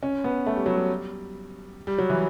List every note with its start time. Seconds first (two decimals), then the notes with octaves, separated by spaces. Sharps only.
0.03 C#4
0.24 B3
0.46 A3
0.56 G3
0.66 F#3
0.76 G3
1.87 G3
1.98 F#3
2.10 E3